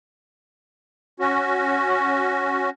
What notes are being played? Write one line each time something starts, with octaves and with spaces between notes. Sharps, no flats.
C#4 F#4